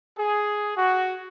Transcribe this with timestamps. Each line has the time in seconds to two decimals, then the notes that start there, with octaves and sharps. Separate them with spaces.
0.18 G#4
0.77 F#4